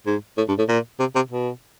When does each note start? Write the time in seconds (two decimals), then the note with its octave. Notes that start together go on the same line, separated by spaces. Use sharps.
0.06 G#2
0.37 A2
0.48 G2
0.58 A2
0.69 A#2
1.00 C3
1.16 C3
1.31 B2